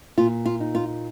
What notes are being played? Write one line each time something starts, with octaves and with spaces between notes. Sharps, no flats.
A#2 F4
F4
D#4
F4